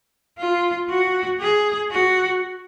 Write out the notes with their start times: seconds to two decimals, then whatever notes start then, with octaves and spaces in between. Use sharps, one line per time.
0.38 F4
0.89 F#4
1.40 G#4
1.91 F#4